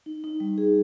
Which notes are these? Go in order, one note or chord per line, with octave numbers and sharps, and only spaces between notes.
D#4
D#4
G3
G#4